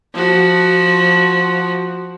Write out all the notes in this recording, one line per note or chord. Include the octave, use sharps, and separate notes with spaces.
F3 F#4